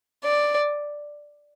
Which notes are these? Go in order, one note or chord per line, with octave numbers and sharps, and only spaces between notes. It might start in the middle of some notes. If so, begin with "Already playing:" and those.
D5